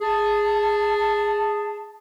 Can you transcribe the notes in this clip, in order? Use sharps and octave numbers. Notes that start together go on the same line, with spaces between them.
G#4 A5